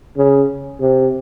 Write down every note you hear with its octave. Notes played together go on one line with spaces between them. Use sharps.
C#3
C3